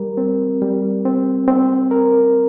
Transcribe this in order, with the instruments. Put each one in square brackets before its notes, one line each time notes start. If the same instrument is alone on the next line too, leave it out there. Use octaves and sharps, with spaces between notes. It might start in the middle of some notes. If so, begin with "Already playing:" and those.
Already playing: [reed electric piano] G3 A#4
C4
G3
C4
C4
A#4